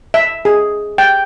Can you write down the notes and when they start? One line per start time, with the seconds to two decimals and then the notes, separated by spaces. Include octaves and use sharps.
0.14 E5
0.45 G#4
0.98 G5